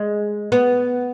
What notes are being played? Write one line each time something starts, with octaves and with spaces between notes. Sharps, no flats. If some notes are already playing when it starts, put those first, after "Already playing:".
Already playing: G#3
B3